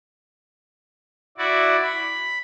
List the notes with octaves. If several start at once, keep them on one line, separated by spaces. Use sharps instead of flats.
E4 F#4 D5
B5